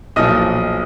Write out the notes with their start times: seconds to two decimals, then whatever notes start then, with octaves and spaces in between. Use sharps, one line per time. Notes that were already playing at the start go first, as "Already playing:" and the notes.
0.16 B1 A#2 F3 D#5 D#6